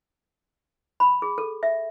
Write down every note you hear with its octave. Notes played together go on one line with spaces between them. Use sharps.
B5
G#4
A4
E5